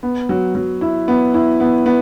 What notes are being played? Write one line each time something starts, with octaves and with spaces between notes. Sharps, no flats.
B3
F#3
F#3
E4
B3
E4
B3
B3